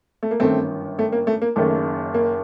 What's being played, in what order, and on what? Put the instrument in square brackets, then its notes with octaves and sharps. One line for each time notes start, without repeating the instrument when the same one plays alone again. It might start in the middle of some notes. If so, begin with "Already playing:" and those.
[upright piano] A3
A#3
G1 F#2 D#3 A3 C4
A3
A#3
A3
A#3
F#1 F#2 D#3 A3
A#3